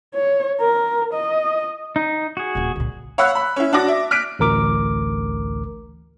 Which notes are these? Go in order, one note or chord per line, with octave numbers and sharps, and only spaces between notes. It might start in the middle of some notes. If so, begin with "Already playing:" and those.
C#5
A#4
D#5
D#4
F#4 G#4
D#1 A#3
C2 A#2
C#5 F5 F#5 B5 E6 F#6
B5
C#4 E4
D4 F#4 D6 A#6
E5
F6 F#6 B6 D7
A1 D2 A#4 D6